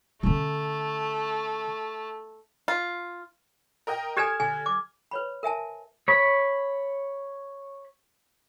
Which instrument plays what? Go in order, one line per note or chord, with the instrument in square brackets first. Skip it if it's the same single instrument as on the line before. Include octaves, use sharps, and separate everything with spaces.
[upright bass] D3 C#4 [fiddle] A3
[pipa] F4
[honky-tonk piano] A#4 D#5 G5
[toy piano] G4 A4 G#5 [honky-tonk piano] F6 G#6 E7
[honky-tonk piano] D3 [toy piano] G#5
[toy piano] D6
B4 C#5 B5
A#4 E5 G#5 A5
[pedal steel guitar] C#5 B5